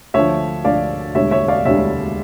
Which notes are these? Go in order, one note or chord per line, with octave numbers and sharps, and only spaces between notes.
D2 D3 F3 C#5 E5
D2 D3 F3 D5 F5
E1 D2 D3 G3 C#5 E5
C#5 E5
D5 F5
E1 D2 D3 G3 C#5 E5